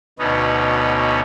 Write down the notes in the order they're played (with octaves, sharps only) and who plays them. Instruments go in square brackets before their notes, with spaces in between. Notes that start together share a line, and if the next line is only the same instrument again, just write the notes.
[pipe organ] D2 B2 B3 C#4 D#4